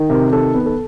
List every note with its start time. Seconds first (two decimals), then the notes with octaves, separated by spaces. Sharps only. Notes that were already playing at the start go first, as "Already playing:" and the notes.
Already playing: D#3
0.10 C3 A#4
0.33 D#3 A4
0.55 B3
0.66 A4